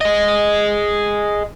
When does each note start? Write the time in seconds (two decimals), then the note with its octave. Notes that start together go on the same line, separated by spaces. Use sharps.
0.01 G#4 D#5